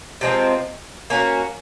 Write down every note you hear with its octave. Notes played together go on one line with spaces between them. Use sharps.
C3 F3 G#3 C4
A#3 C#4 F#4